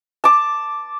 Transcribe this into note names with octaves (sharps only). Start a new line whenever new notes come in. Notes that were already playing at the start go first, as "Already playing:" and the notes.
A5 D6